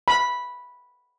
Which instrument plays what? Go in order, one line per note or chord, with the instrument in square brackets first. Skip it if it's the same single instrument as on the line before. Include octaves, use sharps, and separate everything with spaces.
[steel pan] B5